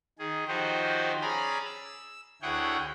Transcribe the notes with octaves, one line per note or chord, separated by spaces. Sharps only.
D#3 G#4
D#3 F3 D#4 F#4 G4 C5
C#4 G#4 D5 G#5 A#5 B5
E6
D2 E4 G#4 C#5 F#5 G5